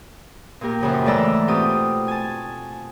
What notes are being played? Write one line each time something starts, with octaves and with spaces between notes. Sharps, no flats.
A#2 A#3 G4 A#4
F#2 C#3 F3
G#2 E3 A3 D5 A#5 E6
B2 C4 F4 G4 D#6
G#5 A5